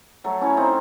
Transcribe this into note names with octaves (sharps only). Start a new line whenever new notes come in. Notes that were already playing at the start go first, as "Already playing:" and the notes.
F#3 A3
C#4 E4
C4 D#4